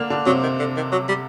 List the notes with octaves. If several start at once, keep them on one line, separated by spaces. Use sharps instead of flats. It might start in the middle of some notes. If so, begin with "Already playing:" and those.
Already playing: D3 A#3 D4
D3 D4
C3 F#3 C4
D#3
D3
D#3
F#3
G3